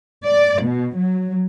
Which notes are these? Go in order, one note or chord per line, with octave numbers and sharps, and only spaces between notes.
D5
B2
F#3